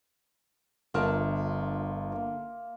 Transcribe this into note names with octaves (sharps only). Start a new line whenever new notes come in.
G1 D3 F4 A#4 E5 A5 F6
A#3